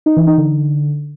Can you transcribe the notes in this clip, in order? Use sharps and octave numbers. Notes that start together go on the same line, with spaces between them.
D#4
E3
D#4
D3